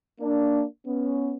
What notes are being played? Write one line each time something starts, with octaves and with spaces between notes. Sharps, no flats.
A#3 D4
B3 C#4